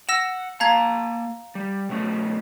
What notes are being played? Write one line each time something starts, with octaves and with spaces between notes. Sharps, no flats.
F#5 E6 A#6 E7
A#3 F5 A5 A#5 G#6
G3
B2 A3 C#4